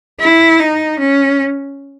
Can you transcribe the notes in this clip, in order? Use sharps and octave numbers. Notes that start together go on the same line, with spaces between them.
E4
D#4
C#4